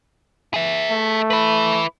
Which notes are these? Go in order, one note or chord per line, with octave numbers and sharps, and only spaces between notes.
G#4 E5
A3
E4 B4